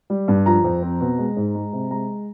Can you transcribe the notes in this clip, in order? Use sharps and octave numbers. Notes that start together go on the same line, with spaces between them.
G3
G2
F3 A#5
F2
C4
B2
G#3
G#2
G#3
C3
G#3 A#5